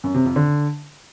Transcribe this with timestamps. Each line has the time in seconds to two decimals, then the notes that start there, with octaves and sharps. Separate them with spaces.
0.04 F#2
0.14 C3
0.25 F2
0.36 D3